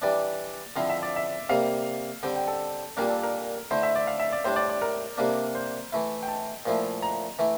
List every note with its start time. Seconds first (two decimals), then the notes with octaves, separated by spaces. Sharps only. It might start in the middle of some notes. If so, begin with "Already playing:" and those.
0.02 E3 G3 D4 D5
0.76 D3 F3 C4 E4 F5
0.90 E5
1.03 D5
1.16 E5
1.49 C3 G3 A#3 F5
2.23 D3 G3 C4 G5
2.36 G5
2.48 A4
2.97 A#2 G3 A#3 D4 A#4
3.10 A4
3.23 A#4
3.71 D3 A3 E4 C5
3.83 E5
3.95 D5
4.07 F5
4.19 E5
4.32 D5
4.45 A2 G3 D4 C5
4.56 D5
4.70 D5
4.82 A#4
5.18 C3 G3 A#3 D4
5.55 C5
5.92 E3 A3 E4
6.23 G5
6.28 A5
6.66 A#2 F3 A3 E4
7.02 A#5
7.39 E3 A3 E4